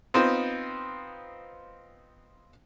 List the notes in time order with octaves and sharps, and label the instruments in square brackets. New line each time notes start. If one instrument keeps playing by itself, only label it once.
[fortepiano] B3 C4 D#4 F4 C5